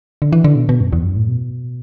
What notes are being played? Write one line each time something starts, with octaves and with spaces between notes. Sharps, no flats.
D3
E3
D3
B2
B2
F#2
E2
F#2
A2
B2